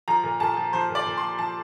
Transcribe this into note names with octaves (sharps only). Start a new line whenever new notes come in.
F3 A#5
A#2
A#2 A5
F3
F3 C5
A#2
D5
A#2
C6
F3
F3 A5